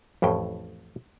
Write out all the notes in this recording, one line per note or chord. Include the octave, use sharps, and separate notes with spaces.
A1 F2 A2 G5